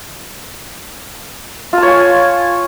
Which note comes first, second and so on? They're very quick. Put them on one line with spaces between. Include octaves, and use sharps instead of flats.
F4 A5 C#5 G#5